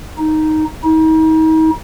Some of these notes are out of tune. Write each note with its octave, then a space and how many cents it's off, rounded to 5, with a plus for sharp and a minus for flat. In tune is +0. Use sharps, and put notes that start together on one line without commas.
D#4 +0
D#4 +35